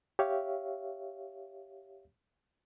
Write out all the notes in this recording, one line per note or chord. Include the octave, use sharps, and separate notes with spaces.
G4 C#5 E5 F5